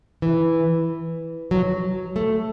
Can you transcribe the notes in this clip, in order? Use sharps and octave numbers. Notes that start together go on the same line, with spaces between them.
E3
F#3
A3